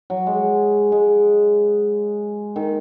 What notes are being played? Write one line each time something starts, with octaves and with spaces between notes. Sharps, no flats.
F#3
G#3
G#3
D#3